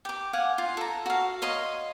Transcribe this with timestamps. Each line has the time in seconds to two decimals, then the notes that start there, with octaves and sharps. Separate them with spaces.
0.05 G4 D6
0.33 F5 F#5 G#5
0.58 F4
0.77 A4 A#5
1.06 F#4 F5
1.42 C#5 D#5 F5 C6